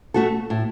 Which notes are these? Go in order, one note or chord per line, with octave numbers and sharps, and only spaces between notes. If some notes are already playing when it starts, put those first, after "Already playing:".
A3 F#4 A4
A2